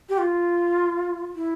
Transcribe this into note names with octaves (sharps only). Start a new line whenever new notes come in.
G4
F4
E4